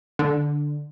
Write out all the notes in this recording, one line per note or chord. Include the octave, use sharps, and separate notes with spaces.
D3